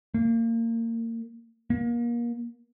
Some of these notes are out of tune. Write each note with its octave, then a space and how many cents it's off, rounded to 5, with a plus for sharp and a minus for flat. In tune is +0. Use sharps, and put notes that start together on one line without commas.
A#3 -30
A#3 +30